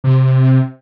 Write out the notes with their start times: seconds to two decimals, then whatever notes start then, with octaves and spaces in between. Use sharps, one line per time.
0.04 C3